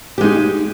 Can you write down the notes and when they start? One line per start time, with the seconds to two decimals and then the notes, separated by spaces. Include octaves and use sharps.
0.18 G4
0.21 G#3
0.24 D#4